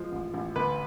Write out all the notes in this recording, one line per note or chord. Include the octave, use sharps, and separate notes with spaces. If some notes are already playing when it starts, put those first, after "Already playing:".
Already playing: F3 G#3 C5
A1
A1
D2 B4